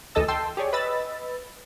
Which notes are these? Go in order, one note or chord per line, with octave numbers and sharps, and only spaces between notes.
D2 E3 A4 D#5 A5 E6
G5 A5 C6 E6
G4 G#4 C#5 D5
B4 D#5 B5 E6 A6